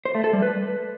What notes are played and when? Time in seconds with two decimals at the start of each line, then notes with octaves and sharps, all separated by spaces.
0.05 C5
0.15 A3
0.24 A4
0.33 G3
0.42 B4